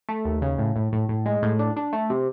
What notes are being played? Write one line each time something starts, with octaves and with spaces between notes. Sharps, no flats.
A3
D#2
C#3
A2
A2
A2
A2
G#3
A2
D4
D4
A3
C3